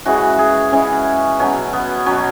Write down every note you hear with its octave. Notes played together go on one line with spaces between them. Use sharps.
C#3 E3 G#3 F#4
G#4
C#3 E3 G#3 C#4
B2 F#3 C#4
B3
B2 F#3 C#4